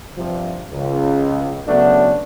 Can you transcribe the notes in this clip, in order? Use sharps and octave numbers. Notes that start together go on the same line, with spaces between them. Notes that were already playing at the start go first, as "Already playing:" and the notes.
G2 C3 F3
C#2
C#3 F#3 A3 B3 D4